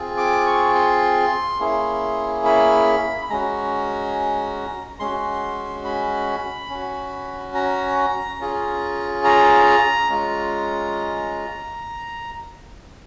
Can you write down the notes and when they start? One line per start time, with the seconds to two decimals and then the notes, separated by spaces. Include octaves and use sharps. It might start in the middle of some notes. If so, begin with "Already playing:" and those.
Already playing: C4 F4 G#4
0.17 D6
0.46 C#6
0.75 C6
1.60 A#3 C#4 E4 G#4
2.45 B5
3.30 G#3 C#4 F#4 A#5
5.00 G#3 C#4 F#4 C6
5.85 B5
6.70 C#4 F#4
7.55 A#5
8.39 C#4 F4 G#4
9.24 A#5
10.10 G#3 C#4 F4